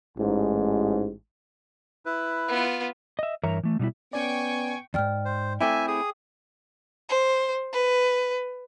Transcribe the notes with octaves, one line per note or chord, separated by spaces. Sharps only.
A1 G#2
E4 B4
B3 F4
D#5 E5
G2 E3 A#4 C#5 E5 A#5
E3 A3
B2 G3 D#4 E4
B3 C#4 D5 G5 G#5 C#6
E2 G#2 D5 G5 F6
C5
A3 C4 E4 E5 G5 G#5 D6
G#4 D#6
C5
B4